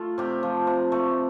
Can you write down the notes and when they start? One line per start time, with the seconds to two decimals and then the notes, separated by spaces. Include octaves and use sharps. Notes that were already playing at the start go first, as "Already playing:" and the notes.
Already playing: A3 F4
0.18 C3 G4
0.43 F3
0.67 C3
0.92 A3